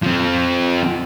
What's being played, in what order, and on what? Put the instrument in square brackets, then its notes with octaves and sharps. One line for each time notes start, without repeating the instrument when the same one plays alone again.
[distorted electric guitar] F3 C4